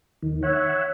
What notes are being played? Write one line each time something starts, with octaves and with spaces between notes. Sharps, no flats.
D#2 D#3
C#5 E5 F#5